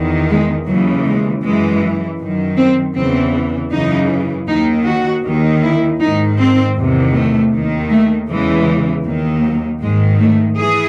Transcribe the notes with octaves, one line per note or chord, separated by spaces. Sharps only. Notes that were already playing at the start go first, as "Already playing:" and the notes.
Already playing: E2 D#3
G#3
D#2 C#3 E3 F#3
G#3
F#2 E3 G#3
F#2 D#3
C4
E2 C#3 E3 C4
F#2 C#3 E3 D#4
D#2 D#3 D#4
F#4
D#2 D#3
E4
G#2 D#3 D#4
C4
E2 C3 D#3
A3
D#2 D#3
A3
E2 C#3 E3 G#3
D#2 D#3
F#3
G#2 D#3 G#3
A3
E3 G#4